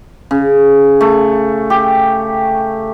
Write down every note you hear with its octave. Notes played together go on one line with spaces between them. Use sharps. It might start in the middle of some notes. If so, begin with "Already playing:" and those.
C#3
A3
G4